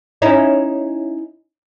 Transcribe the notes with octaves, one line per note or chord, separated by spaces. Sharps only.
C#4 D#4 E4